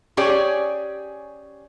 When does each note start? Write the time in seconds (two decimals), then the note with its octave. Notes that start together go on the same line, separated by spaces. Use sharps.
0.17 C#4 G4 G#4 C#5 D5